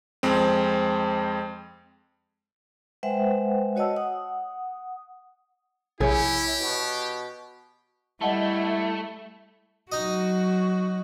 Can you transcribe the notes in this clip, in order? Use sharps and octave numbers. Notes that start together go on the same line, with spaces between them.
F2 G#3 C4
G#3 B4 C5 E5 F#5 G5
F#4 C#5 D#5 F#5 A5 E6
F#5 D#6
A#1 C3 E4 G4 G#4 C#5 G#5
B2
G3 A3 E4 D#5 F#5 A5
F#3 D#4 F#4 D#5